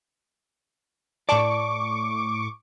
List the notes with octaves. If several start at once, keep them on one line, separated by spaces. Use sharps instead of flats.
A2 D5 A5 C#6 D6